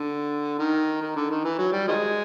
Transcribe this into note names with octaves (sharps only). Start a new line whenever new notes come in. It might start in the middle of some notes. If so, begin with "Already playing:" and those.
Already playing: D3
D#3
D#3
D3
D#3
E3
F#3
G3
D#3 F3 G#3